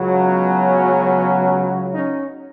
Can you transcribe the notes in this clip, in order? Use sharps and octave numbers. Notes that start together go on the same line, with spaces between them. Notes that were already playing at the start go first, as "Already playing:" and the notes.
Already playing: C#2 C#3 F#3
B3 C#4
C#4 D#4